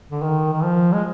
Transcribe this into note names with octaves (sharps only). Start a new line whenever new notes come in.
D3
D#3
D#3
F3
G#3